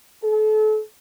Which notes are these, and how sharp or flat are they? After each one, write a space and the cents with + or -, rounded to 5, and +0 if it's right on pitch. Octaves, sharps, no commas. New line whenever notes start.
A4 -35